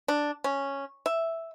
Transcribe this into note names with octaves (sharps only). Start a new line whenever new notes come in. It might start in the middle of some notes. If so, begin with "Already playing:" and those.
D4
C#4
E5